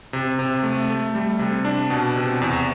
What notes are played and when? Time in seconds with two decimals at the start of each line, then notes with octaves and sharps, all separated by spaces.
0.13 C3
0.39 C3
0.63 A3
0.89 A3
1.15 G3
1.39 C3
1.65 D4
1.90 B2
2.16 C3
2.41 E2